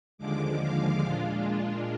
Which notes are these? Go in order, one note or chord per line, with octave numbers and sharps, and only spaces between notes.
D#2 D3 F3 G#3 D6
F5
A#2 G#3 D4 F4